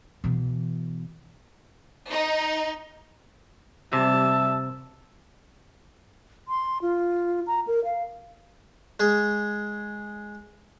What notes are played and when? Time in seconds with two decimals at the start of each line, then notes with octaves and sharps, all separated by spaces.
0.24 B2 E3
2.10 D#4
3.93 C3 G3 E5 A5
6.48 C6
6.82 F4
7.47 A#5
7.67 A#4
7.85 F5
9.00 G#3 G#4